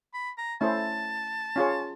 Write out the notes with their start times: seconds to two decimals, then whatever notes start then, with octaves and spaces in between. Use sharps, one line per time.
0.14 B5
0.38 A#5
0.61 A3 C#4 E4 A4 C5 A5
1.56 C#4 F4 G#4 C#5